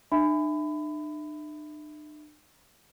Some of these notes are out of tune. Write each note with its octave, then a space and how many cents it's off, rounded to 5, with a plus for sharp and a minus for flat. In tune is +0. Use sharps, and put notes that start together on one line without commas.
D4 +45 E5 -5 B5 +25